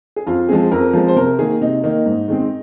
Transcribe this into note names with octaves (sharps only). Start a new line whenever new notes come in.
G#4
F2 F4
F3 G#3 C4 G#4
F2 A#4
F3 G#3 C4
C5
C3 A#4
D#3 A#3 G#4
C3 D#4
D#3 A#3 D#4
G#2
D#3 G#3 C4